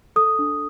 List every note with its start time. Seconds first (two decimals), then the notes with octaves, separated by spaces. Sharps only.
0.16 A4 D#6
0.39 D4